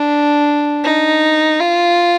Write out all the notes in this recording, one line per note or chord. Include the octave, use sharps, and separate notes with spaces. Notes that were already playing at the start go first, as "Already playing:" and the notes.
Already playing: D4
D#4
F4